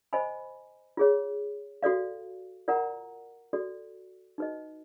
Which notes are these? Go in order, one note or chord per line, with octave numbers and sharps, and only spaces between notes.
C5 D#5 G#5 B5
F4 G#4 C#5
F#4 A4 D5 F5
F4 A#4 D5 F#5 A#5
F#4 A4 D5
D#4 F#4 B4 D#5